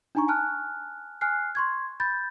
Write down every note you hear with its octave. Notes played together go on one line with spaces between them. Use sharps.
D4 D#4 G#5 A#5 C#6
G#5 A5 F6 F#6
G#5 F6 F#6 C7
C6 C#6 G#6
B5 G6 A6